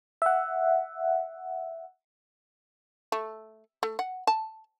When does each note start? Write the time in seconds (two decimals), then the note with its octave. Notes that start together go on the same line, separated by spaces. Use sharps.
0.22 E5 F#5
3.12 A3
3.83 A3
3.99 F#5
4.27 A5